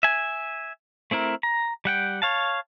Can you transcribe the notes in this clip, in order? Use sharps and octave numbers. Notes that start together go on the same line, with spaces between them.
E5 G#5
A3 C4 E4 A#4
A#5
G3 F#5 G5
C#5 F5 A5